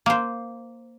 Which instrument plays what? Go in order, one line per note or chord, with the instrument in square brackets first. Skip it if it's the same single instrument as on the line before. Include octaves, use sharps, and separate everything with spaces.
[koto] A#3 C5